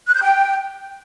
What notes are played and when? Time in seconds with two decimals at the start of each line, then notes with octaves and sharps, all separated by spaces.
0.07 F#6
0.15 G6
0.22 G5